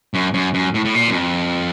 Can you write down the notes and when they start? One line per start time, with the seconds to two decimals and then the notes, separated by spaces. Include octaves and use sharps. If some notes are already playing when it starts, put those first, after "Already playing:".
0.14 F#2
0.34 F#2
0.54 F#2
0.74 A2
0.85 A2
0.95 A#2
1.08 F#2
1.15 F2